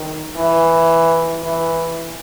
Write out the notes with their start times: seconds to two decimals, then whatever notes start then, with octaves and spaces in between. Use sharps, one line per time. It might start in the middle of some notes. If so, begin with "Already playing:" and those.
Already playing: D#3
0.37 E3
1.43 E3